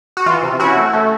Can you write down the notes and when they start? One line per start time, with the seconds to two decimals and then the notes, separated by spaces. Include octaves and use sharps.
0.17 F#4
0.26 E3 F4
0.43 C3
0.59 C#4 E4 F#4
0.77 A3
0.93 A3